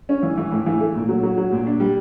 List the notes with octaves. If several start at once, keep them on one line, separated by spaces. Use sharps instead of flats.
C#4
E3
E3
A2
E3
A3
A#2
F#3
F#3
F#3
A#2
D4
G3